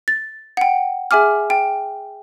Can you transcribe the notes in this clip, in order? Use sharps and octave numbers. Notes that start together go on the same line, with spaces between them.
A6
F#5 G5
G#4 E5 G#5 D6 F6
G5